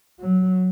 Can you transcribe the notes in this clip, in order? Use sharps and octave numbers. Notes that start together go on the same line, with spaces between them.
F#3